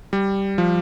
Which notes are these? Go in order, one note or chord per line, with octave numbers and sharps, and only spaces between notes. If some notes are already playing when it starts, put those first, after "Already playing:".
G3
F3